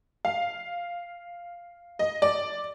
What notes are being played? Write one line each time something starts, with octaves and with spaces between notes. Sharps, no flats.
F5
D#5
D5